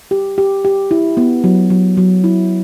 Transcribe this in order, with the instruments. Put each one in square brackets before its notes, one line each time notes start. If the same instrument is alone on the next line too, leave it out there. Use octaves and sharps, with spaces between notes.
[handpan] G4
G4
G4
E4
B3
F#3
F#3
F#3
E4